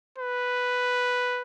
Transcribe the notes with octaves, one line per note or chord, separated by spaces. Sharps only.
B4